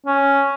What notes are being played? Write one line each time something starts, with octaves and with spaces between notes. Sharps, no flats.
C#4